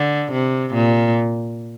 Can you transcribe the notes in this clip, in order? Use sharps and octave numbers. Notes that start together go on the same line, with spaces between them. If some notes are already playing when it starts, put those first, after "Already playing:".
Already playing: D3
C3
A#2